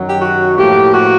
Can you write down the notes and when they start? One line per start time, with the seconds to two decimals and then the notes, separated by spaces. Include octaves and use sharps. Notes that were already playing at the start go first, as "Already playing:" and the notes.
Already playing: F#2 D#3 F#3
0.08 G4
0.20 F#4
0.57 A2 F3 A#3 G4
0.94 F#4